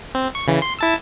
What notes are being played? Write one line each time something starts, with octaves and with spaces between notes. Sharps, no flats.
C4
C#6
C#3 E3
C6
E4 A5 E6